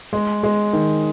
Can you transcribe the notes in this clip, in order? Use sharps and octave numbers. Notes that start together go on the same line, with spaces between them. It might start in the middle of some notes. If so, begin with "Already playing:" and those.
G#3
G#3
D#3